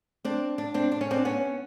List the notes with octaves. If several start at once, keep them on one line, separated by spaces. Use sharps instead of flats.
C4 D4
D4
C4 D4
D4
C#4
C4 D4
B3 C#4